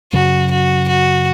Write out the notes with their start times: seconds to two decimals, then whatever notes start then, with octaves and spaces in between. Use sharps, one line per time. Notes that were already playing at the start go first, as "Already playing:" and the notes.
0.13 F#2 C#3 F#3 F#4
0.51 F#4
0.88 F#4